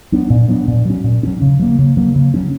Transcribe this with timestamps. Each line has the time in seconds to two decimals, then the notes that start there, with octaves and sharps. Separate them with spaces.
0.12 F#3 B3 D4
0.30 A#2
0.48 F#3 B3 D4
0.68 A#2
0.85 F#3 C#4
1.04 A#2
1.23 F#3 C#4
1.42 C#3
1.60 F#3 A#3
1.79 C#3
1.97 F#3 A#3
2.16 C#3
2.34 F#3 C#4